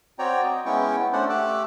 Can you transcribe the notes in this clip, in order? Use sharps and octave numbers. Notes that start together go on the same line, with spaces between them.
C4 F#4 C#5 D5 G5 A#5
D#5
G#3 B3 C#4 E4 G5 C#6
A3 C#4 D4 C5 D5 F#5
A3 G4 D6 E6 F#6